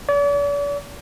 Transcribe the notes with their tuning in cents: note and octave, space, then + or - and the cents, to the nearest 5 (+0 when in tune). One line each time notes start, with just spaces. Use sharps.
D5 -45